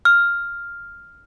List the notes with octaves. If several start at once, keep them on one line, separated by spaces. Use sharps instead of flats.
F6